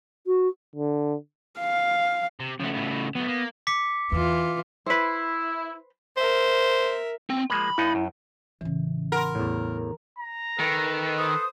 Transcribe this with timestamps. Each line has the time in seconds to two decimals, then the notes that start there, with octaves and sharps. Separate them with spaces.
0.27 F#4
0.76 D3
1.60 F5
2.40 C3
2.60 C#3 F3 A3 B3
2.74 A2 B3
3.15 F#3 A3 B3
3.28 A#3
3.67 D6 B6 C#7
4.12 E2 E3 F4
4.86 E4 B4 C5
6.17 A#4 C5 E5
7.30 C4
7.50 F3 G#3 A#3 B5
7.78 G2 B3 D#4 E4
7.95 F#2
8.61 A1 C#3 E3
9.12 A#4 F#5 B5 C6
9.35 E2 A2
10.19 A#5
10.59 D#3 A4 B4
11.18 C5 D#6